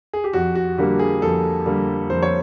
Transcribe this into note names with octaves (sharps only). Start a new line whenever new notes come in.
G#4
G4
F2 F#4
F#4
D3 G3 A#3 G4
G#4
F2 A4
D3 G3 A#3
F2 C5
C#5